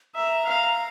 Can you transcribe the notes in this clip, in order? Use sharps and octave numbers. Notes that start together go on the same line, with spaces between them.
E5 A#5
F5